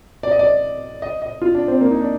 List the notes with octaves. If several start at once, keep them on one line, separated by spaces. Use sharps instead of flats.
D5
D#5
D5
D#5
D#5
F4
D4
C4
A#3
D#4
D4